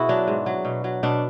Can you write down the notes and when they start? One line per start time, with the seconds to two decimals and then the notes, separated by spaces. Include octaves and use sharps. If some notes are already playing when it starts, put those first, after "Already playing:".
Already playing: B2 E4 F#4 G#4
0.09 F#3 D4
0.28 G#2
0.46 F#3
0.65 B2
0.84 F#3
1.03 B2 D4